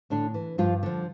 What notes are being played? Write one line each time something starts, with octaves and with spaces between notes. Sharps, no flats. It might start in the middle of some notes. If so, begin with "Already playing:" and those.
A2 D3 D4
E3
G2 F3 F4
D3 F3